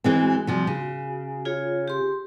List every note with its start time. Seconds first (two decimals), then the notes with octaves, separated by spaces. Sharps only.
0.04 E3 G#3 C4 F#4 G#5
0.47 C3 F3 G3
0.67 C#3
1.45 F4 G#4 C#5
1.88 G4 C6